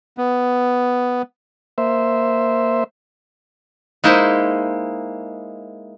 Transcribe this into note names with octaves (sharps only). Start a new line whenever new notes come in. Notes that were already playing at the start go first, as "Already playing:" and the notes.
B3
A#3 C5 E5
G#3 A#3 D#4 E4 C5